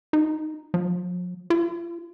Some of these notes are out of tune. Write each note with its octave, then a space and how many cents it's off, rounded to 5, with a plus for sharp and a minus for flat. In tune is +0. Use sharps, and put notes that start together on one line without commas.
D#4 +0
F3 +45
F4 -40